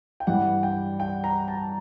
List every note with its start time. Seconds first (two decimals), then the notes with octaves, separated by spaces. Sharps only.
0.20 G5
0.27 G2 E3 G3 F#5
0.63 G5
1.00 G5
1.24 A#5
1.48 A5